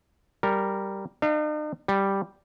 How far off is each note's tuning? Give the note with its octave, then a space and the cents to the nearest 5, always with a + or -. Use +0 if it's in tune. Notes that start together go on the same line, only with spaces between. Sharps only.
G3 +0 A#4 -10
D#4 -45 F5 -35
G3 +0 G5 +0